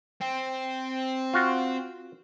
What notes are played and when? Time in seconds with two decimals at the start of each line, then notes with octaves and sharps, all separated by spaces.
0.21 C4
1.34 F4 F#4